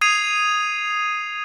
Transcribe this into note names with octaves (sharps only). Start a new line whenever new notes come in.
D#6 G#6 C7 D#7 F7